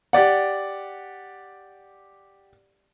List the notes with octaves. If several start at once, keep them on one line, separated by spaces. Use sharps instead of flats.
G4 D5 F#5